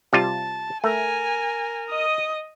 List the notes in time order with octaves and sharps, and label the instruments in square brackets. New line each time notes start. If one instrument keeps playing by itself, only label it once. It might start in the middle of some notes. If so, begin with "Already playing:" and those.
[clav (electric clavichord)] C3 G3 F4 [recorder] A5
[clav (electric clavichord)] A3 [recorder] A#4 [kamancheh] G#5
[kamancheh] D#5 D#6